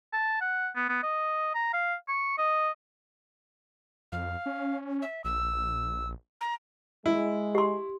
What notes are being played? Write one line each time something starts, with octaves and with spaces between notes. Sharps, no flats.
A5
F#5
B3
B3
D#5
A#5
F5
C#6
D#5
F2 F5
C#4
E5
A#1 E6
A#5
G#3 E4
G4 C6